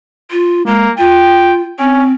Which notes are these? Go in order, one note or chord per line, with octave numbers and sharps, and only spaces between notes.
F4
G#3 A#3
F4 G5
C4 C#4